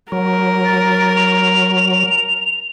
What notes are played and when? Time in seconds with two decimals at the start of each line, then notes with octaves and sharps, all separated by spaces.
0.12 F#3 A#4
0.65 A6
1.15 F7